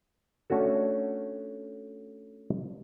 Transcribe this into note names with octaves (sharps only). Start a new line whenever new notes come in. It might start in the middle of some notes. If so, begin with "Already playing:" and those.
A3 C#4 D4 F#4 A4